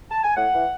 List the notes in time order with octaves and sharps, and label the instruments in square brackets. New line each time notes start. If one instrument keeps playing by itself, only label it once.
[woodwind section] A5
G#5
A2 F#5
E3